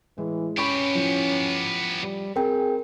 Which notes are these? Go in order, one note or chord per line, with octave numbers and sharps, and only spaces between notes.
A2 E3 G#3
B3 C#4 G4 B5 C#6
A2 F3
G3
C4 G#4 A#4 G5